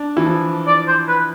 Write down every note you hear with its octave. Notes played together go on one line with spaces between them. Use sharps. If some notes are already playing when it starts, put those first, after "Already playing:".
Already playing: D4
E3
F3
D5
C5
B4